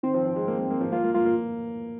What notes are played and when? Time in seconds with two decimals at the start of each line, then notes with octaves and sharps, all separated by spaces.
0.03 D#3 C4
0.14 F3
0.25 F3
0.36 G#3
0.48 A#3
0.58 A#3
0.70 A#3
0.81 F3
0.92 A#3 F4
1.03 A#3
1.14 A#3 F4
1.25 A#3